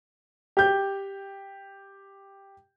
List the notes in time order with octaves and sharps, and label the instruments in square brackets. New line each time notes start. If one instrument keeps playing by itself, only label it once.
[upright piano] G4 G6